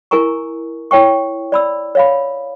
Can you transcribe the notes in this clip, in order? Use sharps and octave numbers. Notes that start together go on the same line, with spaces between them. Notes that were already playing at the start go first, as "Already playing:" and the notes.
E4 A#4 G#5 A#5 C#6
E4 C#5 G5 C#6
D5 B5 E6
C#5 F5 B5